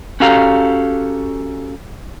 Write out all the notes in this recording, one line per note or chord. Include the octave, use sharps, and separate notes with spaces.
C#4 F#4 G4 A4 F5 A#5